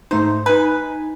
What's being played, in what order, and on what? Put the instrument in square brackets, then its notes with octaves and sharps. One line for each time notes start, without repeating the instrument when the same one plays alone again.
[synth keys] G#2 A3 D#4 [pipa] C5
[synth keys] D#4 G#5 [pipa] B4